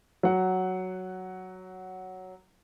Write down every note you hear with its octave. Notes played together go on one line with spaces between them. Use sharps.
F#3 F#5